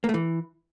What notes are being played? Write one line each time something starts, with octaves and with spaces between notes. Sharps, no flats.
A#3
A3
E3